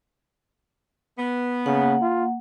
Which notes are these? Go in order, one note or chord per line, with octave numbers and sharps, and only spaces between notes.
B3
C#3 A#3 F#5
F4